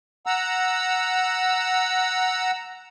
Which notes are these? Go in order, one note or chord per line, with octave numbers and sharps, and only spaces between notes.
F#5 A#5 E6